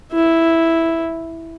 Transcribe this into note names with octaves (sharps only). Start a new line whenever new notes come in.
E4